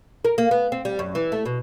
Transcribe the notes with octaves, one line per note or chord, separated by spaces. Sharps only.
A#4
A#3
B3
C4
G3
F#2
E3
A3
B2